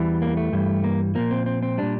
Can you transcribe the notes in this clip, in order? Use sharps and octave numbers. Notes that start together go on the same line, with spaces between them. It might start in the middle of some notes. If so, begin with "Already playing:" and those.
Already playing: E2 E3 G3
A#3
A3
G2 E3 G3
A#3
A#2 F3 A#3
C4
C4
C4
A#2 G3 D4